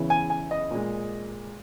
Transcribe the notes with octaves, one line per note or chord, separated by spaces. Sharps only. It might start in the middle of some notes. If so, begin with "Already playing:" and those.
Already playing: E2 C#3 E3
G#5
G#5
D#5
A#2 G#3